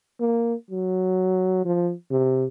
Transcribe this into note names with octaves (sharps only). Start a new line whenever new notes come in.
A#3
F#3
F3
C3